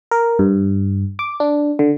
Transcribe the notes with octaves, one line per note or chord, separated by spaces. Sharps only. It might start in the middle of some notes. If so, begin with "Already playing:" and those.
A#4
G2
D6
D4
D3